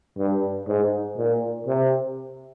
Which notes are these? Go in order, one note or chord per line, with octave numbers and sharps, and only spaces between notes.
G2
G#2
A#2
C3